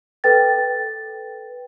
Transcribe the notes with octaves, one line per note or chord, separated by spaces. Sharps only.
A4 B4 G5 A6